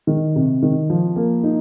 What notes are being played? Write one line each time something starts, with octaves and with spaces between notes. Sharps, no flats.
D#3
C3
D#3
F3
A#3
D#4